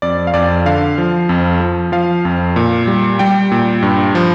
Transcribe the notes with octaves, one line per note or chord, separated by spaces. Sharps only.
F2 D5
F5
F2 D5
D3 F5
F3
F2
F3
F3 F5
F2
A#2
G3
G3 G5
A#2
G2
F3